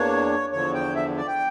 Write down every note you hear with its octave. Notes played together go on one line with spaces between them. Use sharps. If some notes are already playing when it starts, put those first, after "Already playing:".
Already playing: E2 E3 A#3 D4 C#5
E2 D3 F3 C#5
G5
E5
D5
G5